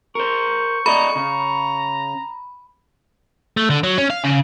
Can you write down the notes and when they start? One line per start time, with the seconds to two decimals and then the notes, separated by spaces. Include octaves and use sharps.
0.15 A#4 C5 C#6
0.86 A4 D5 D#5 A#5 B5
1.16 C#3 A#5
3.57 A3
3.70 D3
3.84 F#3
3.98 C#4
4.10 F5
4.24 C#3